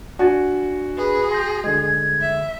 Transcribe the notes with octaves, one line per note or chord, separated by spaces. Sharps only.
D4 F#4 G#5 A6
G#4 B4
C6 G6 A#6
D3 G#3 G#6
E5